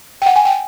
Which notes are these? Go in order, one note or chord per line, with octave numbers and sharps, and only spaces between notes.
G5
F#5
G#5
G5